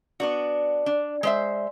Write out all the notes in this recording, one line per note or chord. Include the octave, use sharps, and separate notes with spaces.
B3 D4 F#4 D5
D4
G#3 C5 E5